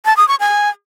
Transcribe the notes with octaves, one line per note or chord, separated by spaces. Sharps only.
A5
D#6
C#6
G#5